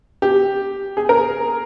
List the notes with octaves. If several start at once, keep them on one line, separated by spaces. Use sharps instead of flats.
G4
G#4
A#4